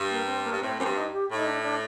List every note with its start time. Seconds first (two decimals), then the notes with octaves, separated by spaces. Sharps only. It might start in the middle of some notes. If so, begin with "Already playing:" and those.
Already playing: G2
0.10 A#3
0.27 C4
0.44 A#3
0.51 G2
0.61 A2 C4
0.78 F#2 C4
0.84 G2
0.95 D#4
1.12 G4
1.30 A2 D#4
1.46 D4
1.63 D4